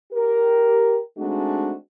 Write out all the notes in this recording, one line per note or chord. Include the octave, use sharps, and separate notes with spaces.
G4 A#4
G#3 A3 C4 D4 D#4 F#4